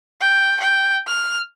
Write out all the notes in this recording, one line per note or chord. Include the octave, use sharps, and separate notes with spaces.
G5
G5
F6